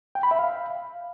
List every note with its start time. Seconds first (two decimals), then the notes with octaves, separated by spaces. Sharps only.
0.15 G5
0.23 B5
0.31 E5
0.39 F5